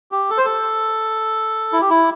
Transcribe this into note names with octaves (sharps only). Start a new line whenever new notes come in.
G4
A4
C5
A4
E4
G4
E4